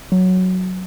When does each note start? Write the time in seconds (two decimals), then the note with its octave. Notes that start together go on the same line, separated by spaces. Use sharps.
0.12 F#3